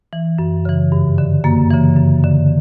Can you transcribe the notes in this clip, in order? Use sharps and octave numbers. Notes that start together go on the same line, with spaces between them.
E3
F#2
C#3 E3
G2
D3
F#2 A#3
C#3 E3
F#2
D3